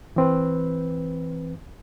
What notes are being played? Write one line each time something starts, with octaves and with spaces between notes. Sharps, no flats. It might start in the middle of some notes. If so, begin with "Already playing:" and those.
E3 C4 B4